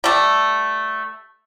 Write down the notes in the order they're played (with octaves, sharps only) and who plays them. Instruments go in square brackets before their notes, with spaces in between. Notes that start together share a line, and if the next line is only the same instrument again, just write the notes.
[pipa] G3 A3